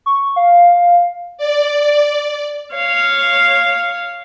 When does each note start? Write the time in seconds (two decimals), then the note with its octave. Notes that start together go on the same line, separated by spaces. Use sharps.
0.06 C#6
0.36 F5
1.38 D5
2.74 C#5 F5